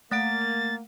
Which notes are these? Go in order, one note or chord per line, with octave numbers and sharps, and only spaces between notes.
A3 A#3 F#5 A6 D7